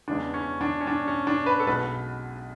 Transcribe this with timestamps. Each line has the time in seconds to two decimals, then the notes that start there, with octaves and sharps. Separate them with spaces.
0.08 E2 C#3 E3 G#3 D4
0.34 C#4
0.61 D4
0.81 C#4
0.87 D4
1.08 C#4
1.27 D4
1.46 B4
1.60 A4
1.67 B1 B2 G#3 B4